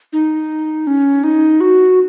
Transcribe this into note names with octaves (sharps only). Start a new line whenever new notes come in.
D#4
C#4
D#4
F#4